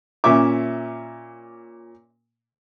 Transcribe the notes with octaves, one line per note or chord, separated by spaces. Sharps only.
A#2 C#4 E5 D6